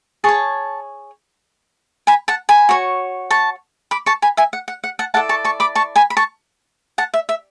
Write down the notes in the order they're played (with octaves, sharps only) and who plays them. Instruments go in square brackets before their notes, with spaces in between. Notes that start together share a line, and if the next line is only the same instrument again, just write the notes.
[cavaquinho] G#4 C#5 A5 C#6
G#5 B5
F#5 A5
G#5 B5
F#4 C#5
A5 C#6
B5 D6
A5 C#6
G#5 B5
E5 G#5
F#5
F#5
F#5
F#5 A5
E4 A4 D5 F#5 A5
A5 C#6
A5 C#6
B5 D6
A5 C#6
G#5 B5
B5
A5 C#6
F#5 A5
E5
E5